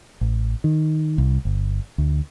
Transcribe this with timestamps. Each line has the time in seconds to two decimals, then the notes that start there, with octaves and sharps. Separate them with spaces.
0.21 A1
0.64 D#3
1.18 C2
1.45 G1
1.98 D2